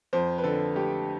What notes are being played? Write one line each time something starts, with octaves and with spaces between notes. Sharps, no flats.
F2 C5
B4
D3 A4
A3 G4